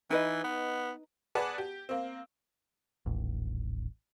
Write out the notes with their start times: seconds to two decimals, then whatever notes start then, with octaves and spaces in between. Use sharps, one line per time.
0.10 E3 D#4 B4 D#5
0.44 B3
1.35 G#4 B4 D5 F#5 A5
1.58 G4
1.89 A#3 C4
3.06 D#1 A1